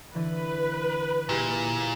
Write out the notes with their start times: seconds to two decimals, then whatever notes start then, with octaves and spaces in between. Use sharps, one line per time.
0.15 D3 E3 B4
1.29 A#2 E4 G4 G#4